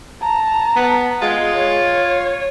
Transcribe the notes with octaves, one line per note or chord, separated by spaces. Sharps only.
A5 A#5
B3
G#3 F4
C#5